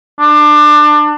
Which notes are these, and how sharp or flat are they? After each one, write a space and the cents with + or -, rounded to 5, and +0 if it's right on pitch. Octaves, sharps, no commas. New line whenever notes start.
D4 +25